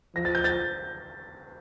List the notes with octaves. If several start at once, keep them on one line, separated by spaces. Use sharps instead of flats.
F3 A#6
A6
G6
A6